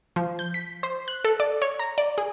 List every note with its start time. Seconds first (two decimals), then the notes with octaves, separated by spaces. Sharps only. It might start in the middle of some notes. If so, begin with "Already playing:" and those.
0.16 F3
0.39 G6
0.54 B6
0.83 C5
1.08 F#6
1.25 A4
1.40 D5
1.62 C#5
1.79 A#5
1.98 D5
2.18 G#4